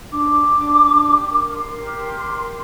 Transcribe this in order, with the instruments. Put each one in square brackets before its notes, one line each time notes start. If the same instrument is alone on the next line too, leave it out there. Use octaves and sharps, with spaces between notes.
[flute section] D4 D6
G4
D4
D4
G4
A#4
A#4 C6
G4
A#4
G4
G4